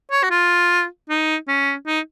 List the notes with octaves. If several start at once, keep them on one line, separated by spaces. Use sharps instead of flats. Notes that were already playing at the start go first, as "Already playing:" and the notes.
C#5
F#4
F4
D#4
C#4
D#4